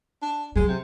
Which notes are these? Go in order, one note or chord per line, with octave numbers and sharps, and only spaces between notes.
D4
F#3 G#3
C3